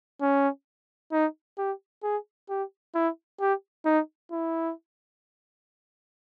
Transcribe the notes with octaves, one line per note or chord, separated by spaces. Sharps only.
C#4
D#4
G4
G#4
G4
E4
G4
D#4
E4